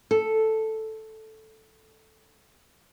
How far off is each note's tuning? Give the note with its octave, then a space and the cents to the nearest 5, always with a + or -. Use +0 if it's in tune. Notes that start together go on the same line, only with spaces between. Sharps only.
A4 +0